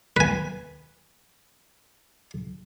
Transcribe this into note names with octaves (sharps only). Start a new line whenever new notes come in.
B4 G#5